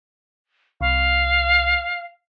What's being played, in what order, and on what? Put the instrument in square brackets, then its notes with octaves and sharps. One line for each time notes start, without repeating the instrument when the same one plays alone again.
[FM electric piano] C2 [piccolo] F5